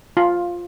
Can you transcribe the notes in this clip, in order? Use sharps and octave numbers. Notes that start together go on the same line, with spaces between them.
F4